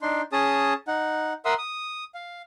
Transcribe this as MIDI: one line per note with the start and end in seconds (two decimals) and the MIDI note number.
0.02 0.22 62
0.02 0.22 63
0.02 0.22 84
0.32 0.73 61
0.32 0.73 68
0.32 0.73 81
0.32 0.73 87
0.87 1.33 63
0.87 1.33 78
1.45 1.54 70
1.45 1.54 76
1.45 1.54 78
1.45 1.54 84
1.45 1.54 87
1.45 1.54 88
1.58 2.04 87
2.14 2.42 77